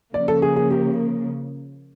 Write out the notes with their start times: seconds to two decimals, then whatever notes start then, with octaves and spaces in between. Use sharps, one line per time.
0.13 C#3 F3 A#3 D5
0.28 A4
0.42 G#4
0.56 G#4
0.70 G4